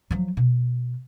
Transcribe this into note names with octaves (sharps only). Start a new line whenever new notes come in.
F3 F#3
B2